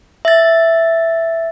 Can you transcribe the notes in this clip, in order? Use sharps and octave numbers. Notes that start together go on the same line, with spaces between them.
E5 A6